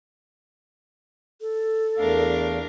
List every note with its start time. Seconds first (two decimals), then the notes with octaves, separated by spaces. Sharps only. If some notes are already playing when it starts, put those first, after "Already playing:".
1.41 A4
1.98 E2 A3 D4 A#4 F5